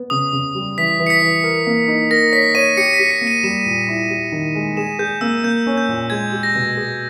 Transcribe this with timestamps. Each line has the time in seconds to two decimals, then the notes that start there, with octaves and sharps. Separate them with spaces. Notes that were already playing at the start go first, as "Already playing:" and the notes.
Already playing: B3
0.10 C#3 D#6
0.33 C#3
0.55 G3
0.78 E3 B6
0.99 E3
1.07 C#7
1.10 B6
1.22 E3
1.44 A#4
1.67 A#3
1.88 D#4
2.11 A#4 A#6
2.32 C#5 B6
2.55 C#5 D#7
2.77 G4 C#7
2.93 B6
3.00 G4
3.11 C#7
3.21 A#3
3.27 D#7
3.43 G3 E7
3.66 A#2
3.88 E4
4.10 G4
4.32 D#3
4.55 G#3
4.77 G#4 E7
4.99 G#4 G6
5.21 A#3 E6
5.44 A#3 G6
5.67 C#4
5.78 G6
5.89 A#2
6.10 G#3 G#6
6.32 G4
6.43 A#6
6.55 B2
6.77 G#4